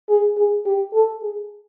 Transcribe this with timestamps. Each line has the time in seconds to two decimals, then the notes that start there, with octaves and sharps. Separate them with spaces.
0.09 G#4
0.37 G#4
0.66 G4
0.94 A4
1.22 G#4